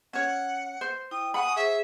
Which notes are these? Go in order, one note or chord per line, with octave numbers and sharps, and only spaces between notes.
C#4 C#5 F#5
C5
E4 G5 D#6
F#5 G#5 B5 C#6 D#6
G#4 C5 E5